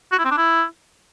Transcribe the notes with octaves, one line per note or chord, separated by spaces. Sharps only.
F#4
E4
C4
D4
E4